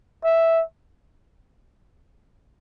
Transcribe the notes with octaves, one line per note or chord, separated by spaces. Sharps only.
E5